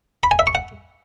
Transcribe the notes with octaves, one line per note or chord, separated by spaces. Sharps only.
B5
G#5
E5
C#6
F#5